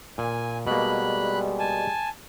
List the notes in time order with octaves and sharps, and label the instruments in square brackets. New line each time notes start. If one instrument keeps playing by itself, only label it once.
[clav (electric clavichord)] A#2 [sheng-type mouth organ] G#5
[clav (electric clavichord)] B2 A#3 [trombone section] G3 G#3 [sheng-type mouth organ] B5 F#6
[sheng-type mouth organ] G#5 A5